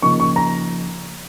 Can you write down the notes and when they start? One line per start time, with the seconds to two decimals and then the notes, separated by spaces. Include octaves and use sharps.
0.02 C#3 F3 A#3 D#4 C#6
0.20 C#6
0.36 A#5